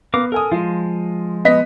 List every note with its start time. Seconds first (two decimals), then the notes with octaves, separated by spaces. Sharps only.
0.14 B3 A#4 F5 D6
0.32 A4 A#4 G#5 D#6
0.52 F3 G#3 F4
1.45 B3 D#5 B6